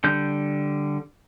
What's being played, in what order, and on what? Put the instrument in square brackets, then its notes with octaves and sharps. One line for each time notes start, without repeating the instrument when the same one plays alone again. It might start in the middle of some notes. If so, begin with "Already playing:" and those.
[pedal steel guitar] D3 G3 G6